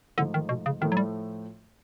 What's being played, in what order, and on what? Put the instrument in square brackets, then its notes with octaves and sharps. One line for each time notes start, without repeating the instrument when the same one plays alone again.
[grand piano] G#2 F3 A3 [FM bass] D3
[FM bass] D#3
B2
C#3
[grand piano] A2 F3 A3 [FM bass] D#3
[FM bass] F#3
G3